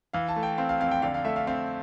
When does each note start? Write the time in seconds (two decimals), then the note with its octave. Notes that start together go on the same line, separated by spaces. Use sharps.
0.13 E3 F5
0.29 A5
0.36 A3
0.43 G5
0.58 C4 F5
0.69 F5
0.80 F2 F5
0.91 G5
1.02 D3 F5
1.14 F5
1.25 A3 E5
1.36 F5
1.47 C4 F5